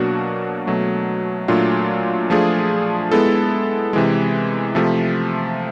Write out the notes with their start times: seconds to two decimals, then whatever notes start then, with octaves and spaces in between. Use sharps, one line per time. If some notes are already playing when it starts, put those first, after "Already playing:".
Already playing: B2 F#3 A#3 D4 F#4
0.67 B2 F#3 A3
1.48 A#2 F#3 A3 D4 F4
2.30 F3 A3 D4 F4 G#4
3.12 G#3 B3 E4 A4
3.93 C3 E3 G#3
4.75 C3 F3 A3